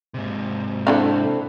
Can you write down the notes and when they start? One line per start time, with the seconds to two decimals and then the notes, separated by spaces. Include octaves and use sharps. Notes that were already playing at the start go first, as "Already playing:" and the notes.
0.14 G#2 C3
0.87 D3 C4 D4 E4 A4 F5